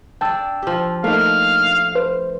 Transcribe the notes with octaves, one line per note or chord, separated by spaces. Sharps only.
D4 D5 G5 A5 E6
F3 G4
A3 A#3 D4 D#4 F5
B4 C5